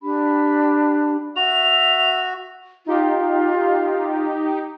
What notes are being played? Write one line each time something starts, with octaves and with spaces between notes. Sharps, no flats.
D4 G4 B5
F#4 E5 F7
D#4 F4 G4